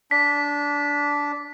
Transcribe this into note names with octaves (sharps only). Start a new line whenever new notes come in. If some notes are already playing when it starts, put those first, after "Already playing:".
D4 B6